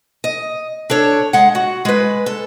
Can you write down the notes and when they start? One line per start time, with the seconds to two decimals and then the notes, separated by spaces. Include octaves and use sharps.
0.24 D#5
0.90 D4 A4 C#5
1.33 G#3 F#5
1.55 F#4
1.85 G#3 B4
2.26 A4